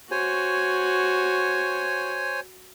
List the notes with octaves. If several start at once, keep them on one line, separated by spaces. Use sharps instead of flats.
F#4 C5 C#5 G#5